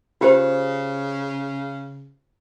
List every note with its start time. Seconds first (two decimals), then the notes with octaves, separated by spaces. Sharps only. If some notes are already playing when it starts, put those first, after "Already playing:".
0.21 C#3 F4 G4 C5